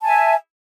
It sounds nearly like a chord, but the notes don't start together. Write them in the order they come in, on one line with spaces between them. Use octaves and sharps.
A5 G#5 E5